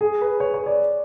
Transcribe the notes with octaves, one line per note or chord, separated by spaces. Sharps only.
G#4
B4
C#5
C#5
D5